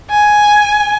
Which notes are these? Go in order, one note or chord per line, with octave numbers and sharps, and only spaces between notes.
G#5